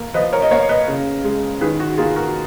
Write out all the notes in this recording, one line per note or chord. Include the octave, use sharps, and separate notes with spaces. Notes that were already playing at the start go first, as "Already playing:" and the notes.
Already playing: A#3
F3 B4 D#5
A#4 C#5
D#5
A#3 C#5 F5
B4 D#5
C#3
G#3
D#3 G#4 B4
F#4
A#3 F4 G#4
F#4 A#4